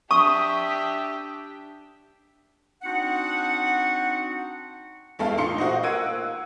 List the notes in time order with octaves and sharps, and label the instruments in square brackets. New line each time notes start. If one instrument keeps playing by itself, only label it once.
[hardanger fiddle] D4 G4 [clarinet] E5 [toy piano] C#6 [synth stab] D#6
[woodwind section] C4 D4 D#4 F#4 F#5
[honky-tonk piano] E2 G#3 A3 A4 F5
A#2 D#4 C6 C#7
F4 F#4 C5 D#5
A#3 F#5 E6 G#6 D7 D#7